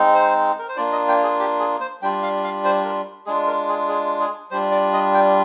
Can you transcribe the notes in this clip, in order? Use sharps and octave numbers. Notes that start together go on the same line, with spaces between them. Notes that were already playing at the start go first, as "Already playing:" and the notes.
Already playing: G#3 C4 D#4
C5
A#4
C5
A#3 D4 F4 D5
D#5
G5
G#4
G4
G#4
C5
G3 D4 F4 G5
F5
F5
C5
A#4
G#3 D4 F4 G#4
A#4
G#4
G#4
G#4
G3 D4 F4 C5
D5
D#5
G5